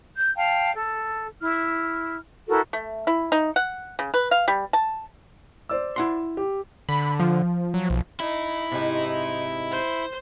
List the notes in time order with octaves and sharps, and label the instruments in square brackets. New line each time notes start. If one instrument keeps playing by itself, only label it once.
[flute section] G6
F5 G5 A5
A4
E4 F6
E4 F#4 A4 A#4
[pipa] A3
E4
D#4
F#5
C#3
B4
F5
G3
A5
[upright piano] C5 D5 E6
[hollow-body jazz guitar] E4 F#5 C6
[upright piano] G4
[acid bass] D3 [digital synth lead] B5
[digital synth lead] F3
[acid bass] F#3
B1
[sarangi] D#4 [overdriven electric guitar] E4
[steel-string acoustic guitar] G#2 C3 [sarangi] D#4
[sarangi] C5